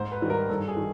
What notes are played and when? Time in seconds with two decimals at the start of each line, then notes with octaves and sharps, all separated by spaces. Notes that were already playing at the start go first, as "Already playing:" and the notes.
Already playing: G#2 C5
0.12 B4
0.21 D#3 G3
0.30 A#4
0.49 G2 A4
0.68 G#4
0.77 D#3